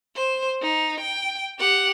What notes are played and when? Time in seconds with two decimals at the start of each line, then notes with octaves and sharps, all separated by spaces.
0.16 C5
0.63 D#4
1.00 G5
1.59 G4 F#5